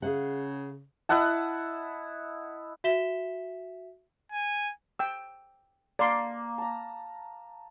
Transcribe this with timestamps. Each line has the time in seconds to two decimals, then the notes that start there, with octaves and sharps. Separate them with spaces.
0.02 C#3 G#4 F5 F#5
1.09 E4 D#5 F#5 A5
2.84 F#4 E5 B6 E7 G7
4.32 G#5
4.99 G5 E6
5.99 A#3 D5 C6
6.58 A5 A#5